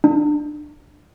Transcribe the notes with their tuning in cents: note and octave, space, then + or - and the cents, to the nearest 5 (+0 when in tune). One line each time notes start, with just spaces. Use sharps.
D4 +20